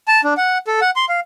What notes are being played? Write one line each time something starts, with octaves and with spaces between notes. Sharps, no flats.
A5
D4
F#5
A4
F#5
C6
F5